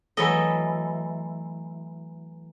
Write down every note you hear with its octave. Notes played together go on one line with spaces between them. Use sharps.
E3 F#3 A3 A4 D#5